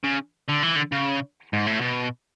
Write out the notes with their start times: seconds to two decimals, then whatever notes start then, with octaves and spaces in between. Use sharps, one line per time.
0.04 C#3
0.48 D3
0.63 E3
0.76 D3
0.92 C#3
1.53 G#2
1.67 A2
1.81 B2